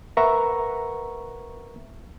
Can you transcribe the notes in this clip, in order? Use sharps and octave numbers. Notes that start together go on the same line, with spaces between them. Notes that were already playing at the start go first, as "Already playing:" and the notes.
A#4 B4 E5 F#5 A#5 C#6